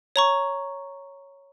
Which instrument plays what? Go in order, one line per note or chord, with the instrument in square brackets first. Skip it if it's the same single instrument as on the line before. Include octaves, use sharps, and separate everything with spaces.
[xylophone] C#5 A#5 C#6